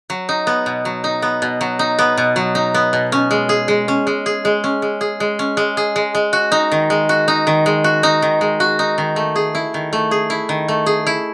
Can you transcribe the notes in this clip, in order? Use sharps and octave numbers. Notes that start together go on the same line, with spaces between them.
F#3
D#4
B3
B2
F#3
D#4
B3
B2
F#3
D#4
B3
B2
F#3
D#4
B3
B2
C#4
G#3
G#4
G#3
C#4
G#3
G#4
G#3
C#4
G#3
G#4
G#3
C#4
G#3
G#4
G#3
G#3
F#4
D#4
D#3
G#3
F#4
D#4
D#3
G#3
F#4
D#4
D#3
G#3
F#4
D#4
D#3
A3
G#4
E4
D#3
A3
G#4
E4
D#3
A3
G#4
E4